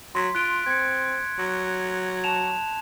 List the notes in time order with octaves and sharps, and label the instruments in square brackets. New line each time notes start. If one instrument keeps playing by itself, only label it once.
[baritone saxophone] F#3 [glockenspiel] C6 B6
[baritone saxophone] F4 [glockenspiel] F#6 D7
[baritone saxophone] C4 [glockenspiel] G#6 C#7
[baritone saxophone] F#3
[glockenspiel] A5 E7 F7